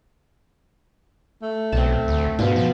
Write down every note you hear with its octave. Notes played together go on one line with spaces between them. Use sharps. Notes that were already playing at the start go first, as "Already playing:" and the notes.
A3
B1 C4 A5
D2
G#2 B2 F4
F3